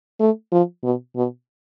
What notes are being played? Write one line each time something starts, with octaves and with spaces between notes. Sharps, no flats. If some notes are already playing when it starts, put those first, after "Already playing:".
A3
F3
B2
B2